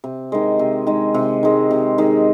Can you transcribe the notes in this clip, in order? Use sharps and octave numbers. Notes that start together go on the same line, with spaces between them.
C3
D#3 G#3
C3
D#3 G#3
C3
D#3 G#3
C3
D#3 G#3